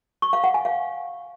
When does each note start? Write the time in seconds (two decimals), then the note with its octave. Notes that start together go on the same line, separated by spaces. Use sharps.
0.22 C#6
0.33 F5
0.44 F#5
0.54 G#5
0.65 F5